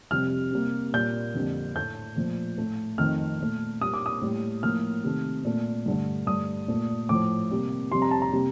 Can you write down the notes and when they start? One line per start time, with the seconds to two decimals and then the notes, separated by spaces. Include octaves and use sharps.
0.11 F2 C3 G3 F6
0.52 C3 G3 A#3
0.93 A#2 G3 A#3 G6
1.35 F2 D3 G3 A#3
1.76 A2 A3 G6
2.16 A#2 F3 A3
2.58 A2 A3
2.98 F2 D#3 A3 F6
3.40 A#2 A3
3.81 A#2 G3 A#3 D#6
3.94 D6
4.06 D#6
4.22 A2 G3 A#3
4.63 A2 F3 A#3 F6
5.04 C3 D#3 A3
5.45 A#2 A3
5.86 G2 D3 A3
6.27 G2 D3 A3 D#6
6.68 A#2 A3
7.09 A2 F3 A3 D6
7.51 C3 G3 A#3
7.92 F2 C3 G3 C6
8.02 A#5
8.11 A5
8.22 A#5
8.32 C3 G3 A#3